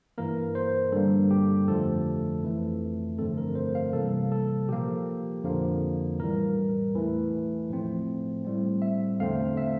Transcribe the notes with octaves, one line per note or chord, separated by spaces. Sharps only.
G2 E3 A#3 A#4
C5
G2 D3 G3 A#3 A4
G4
F2 D3 F3 A3 A4
F2 E3 A3
G2 D3 F3 A3 C4 A4
A#4
C5
F5
C3 E3 G3 A#3 A4
A4
A#2 F3 A#3 G4
F2 D3 F3 A#3
A2 E3 G3 A#4
E2 E3 A3
A2 F3 A3 C4
A2 G3 C4
E5
E2 D3 A3 C4 F5
E5